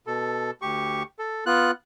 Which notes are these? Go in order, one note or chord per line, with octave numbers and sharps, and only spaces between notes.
B2 A4
D2 G4 C#6
A4
B3 F4 F#6